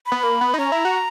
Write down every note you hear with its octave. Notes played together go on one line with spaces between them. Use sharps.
B5
B3
A#3
B3
D#4
C#4 A#5
E4
F#4